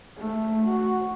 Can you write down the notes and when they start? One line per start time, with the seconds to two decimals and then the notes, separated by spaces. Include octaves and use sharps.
0.18 A3
0.68 F#4